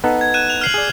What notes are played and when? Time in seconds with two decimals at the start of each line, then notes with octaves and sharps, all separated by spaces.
0.04 B3 D#4 A4
0.21 G#6
0.34 F#6 D#7 E7
0.50 F7
0.61 F6 C7 F#7
0.74 G#4 D5